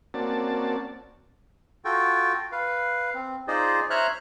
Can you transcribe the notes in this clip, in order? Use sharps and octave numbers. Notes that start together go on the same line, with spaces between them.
A#3 C4 C#4 F#4 D5 A5
F4 F#4 A4 G5
B4 F5
C4
D#4 F4 G#4 C5 D5 D#5
C5 C#5 E5 A#5 F6 F#6